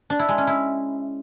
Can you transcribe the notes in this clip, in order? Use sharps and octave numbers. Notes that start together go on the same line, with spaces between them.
D4
E4
G#3
C#4
E4